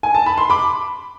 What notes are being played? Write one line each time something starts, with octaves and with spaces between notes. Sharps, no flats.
G#5
A5
B5
C6
B5 D6